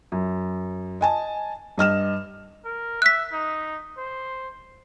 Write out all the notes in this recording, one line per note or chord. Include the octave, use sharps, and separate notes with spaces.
F#2
D#5 G#5 A5
G2 D#5 F6 E7
A#4
E5 F#6 B6
D#4
C5